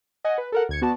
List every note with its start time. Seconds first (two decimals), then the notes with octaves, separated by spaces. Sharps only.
0.25 D#5 F#5 G#5
0.38 B4
0.52 A4 A#4 F#5
0.69 D2 G#6 C#7
0.82 B3 F#4 D5 A5